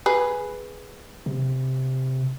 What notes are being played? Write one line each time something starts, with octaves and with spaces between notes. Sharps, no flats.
G#4 B4
C3